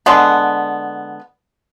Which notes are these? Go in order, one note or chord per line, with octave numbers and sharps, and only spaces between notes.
D3 G#3 B3